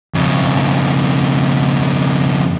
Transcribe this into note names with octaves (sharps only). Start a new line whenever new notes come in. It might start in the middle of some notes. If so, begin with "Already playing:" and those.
F2 C#3